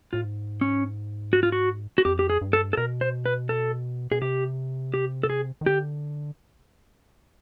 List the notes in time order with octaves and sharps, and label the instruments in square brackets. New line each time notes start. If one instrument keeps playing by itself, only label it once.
[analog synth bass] A2 [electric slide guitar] F4
[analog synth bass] G#2
[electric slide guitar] C#4
F#4
F4
F#4
F#4
[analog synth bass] F2 [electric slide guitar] G4
[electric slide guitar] G4
G#4
[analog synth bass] G2
[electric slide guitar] A4
A4
[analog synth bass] B2 [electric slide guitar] A#4
[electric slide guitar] C5
B4
A4
[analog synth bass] B2 [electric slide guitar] G#4
[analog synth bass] C3 [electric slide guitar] G4
[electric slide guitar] G4
A4
G#4
[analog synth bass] D#3
[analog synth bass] D3 [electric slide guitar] G4